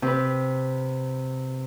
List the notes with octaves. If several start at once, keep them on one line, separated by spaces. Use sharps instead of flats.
C3 B4